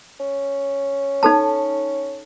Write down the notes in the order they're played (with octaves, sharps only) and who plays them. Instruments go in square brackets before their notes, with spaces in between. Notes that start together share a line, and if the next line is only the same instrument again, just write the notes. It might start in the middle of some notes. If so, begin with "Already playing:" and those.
[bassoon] C#4
[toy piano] D#4 A4 A5